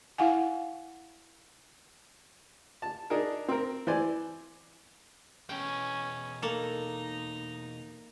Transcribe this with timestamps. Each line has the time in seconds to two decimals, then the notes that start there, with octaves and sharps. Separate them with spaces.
0.18 E4 F5 F#5 G#5
2.82 A5
3.10 D4 D#4 G#4 A#4
3.48 C4 A#4
3.87 E3 C5 D5 G#5
5.49 E2 B2 C#4 G5
6.42 A#3 D#4 A4 A#5